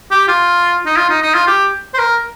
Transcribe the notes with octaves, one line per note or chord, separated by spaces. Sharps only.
G4
F4
D#4
F4
D#4
D#4
F4
G4
C5
A#4